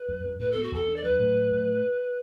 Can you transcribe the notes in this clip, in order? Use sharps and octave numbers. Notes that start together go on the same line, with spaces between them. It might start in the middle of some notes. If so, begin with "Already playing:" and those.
Already playing: B4
F#2
F#2
A2 B4
B3 A4
F#4
E2 A4
D4
D5
F#3 B4
A2
F#3
A2